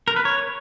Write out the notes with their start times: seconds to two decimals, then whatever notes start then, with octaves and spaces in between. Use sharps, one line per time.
0.08 A#4
0.16 B4
0.25 C#5